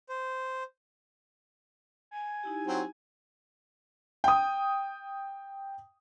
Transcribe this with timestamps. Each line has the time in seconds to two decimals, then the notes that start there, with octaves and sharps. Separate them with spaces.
0.09 C5
2.11 G#5
2.43 D#4 E4 G4
2.67 F#3 C4
4.24 G5 D#6